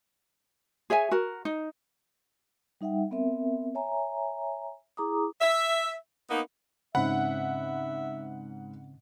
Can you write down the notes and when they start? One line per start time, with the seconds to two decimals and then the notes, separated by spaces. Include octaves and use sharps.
0.90 G#4 C#5 E5 G#5
1.11 F#4 A#4
1.45 D#4
2.81 G3 D#4 E5 F#5 G5
3.11 B3 C4 A#4 E5
3.75 C#5 E5 G#5 A#5
4.97 E4 G#4 A#5 D6 D#6
5.41 E5
6.29 A#3 B3 D#4
6.95 G#2 C#3 C4 C#4 E5 F#5 B5